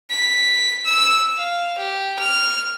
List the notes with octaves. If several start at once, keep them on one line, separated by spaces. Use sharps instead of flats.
B6
E6
F5
G4
F6